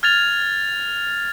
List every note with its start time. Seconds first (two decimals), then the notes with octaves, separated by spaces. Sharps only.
0.03 F6 G#6 A6 F7